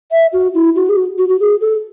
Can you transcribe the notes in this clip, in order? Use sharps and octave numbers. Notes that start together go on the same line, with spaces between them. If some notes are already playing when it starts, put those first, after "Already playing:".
E5
F#4
E4
F#4
G#4
F#4
F#4
F#4
G#4
A4